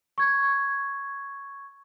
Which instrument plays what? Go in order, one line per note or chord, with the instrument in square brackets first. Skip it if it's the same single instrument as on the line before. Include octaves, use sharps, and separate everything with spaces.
[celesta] C#6 G#6